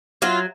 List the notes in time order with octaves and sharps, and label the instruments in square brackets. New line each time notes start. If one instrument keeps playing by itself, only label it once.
[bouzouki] F#3 F4